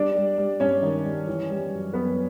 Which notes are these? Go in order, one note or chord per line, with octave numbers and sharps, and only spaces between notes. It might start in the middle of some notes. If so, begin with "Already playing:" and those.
Already playing: G3 D4 D5
G3
G3
G2 C#4 C#5
D#3
G3
E3
G3
F#2
F#2 B3 B4